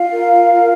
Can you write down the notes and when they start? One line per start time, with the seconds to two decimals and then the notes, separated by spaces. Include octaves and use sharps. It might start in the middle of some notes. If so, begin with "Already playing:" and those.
Already playing: F4 F5
0.12 A#4
0.53 F4